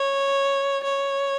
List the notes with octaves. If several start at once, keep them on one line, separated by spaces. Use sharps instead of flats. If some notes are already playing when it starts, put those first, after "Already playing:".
Already playing: C#5
C#5